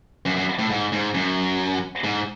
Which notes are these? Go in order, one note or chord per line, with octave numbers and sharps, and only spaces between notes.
F#2
F#2
A2
G#2
G#2
F#2
G#2